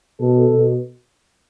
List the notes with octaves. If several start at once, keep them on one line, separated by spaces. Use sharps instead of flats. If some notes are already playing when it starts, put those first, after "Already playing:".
B2 A4
B2